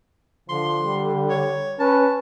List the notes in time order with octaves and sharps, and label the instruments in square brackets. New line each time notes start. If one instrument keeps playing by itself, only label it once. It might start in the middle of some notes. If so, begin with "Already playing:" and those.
[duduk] D3 [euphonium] F3 [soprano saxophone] C6
[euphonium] G3
[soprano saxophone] C#5
[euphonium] C#4 [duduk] B4 [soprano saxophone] A5